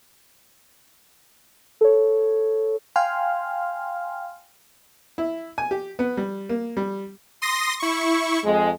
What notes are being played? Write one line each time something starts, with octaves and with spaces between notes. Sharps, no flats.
A4 C#5
F5 G5 G#5 C6 F6
E4
G#5
G4
B3
G3
A#3
G3
C6 D#6 A#6
E4 C#6
F2 G#3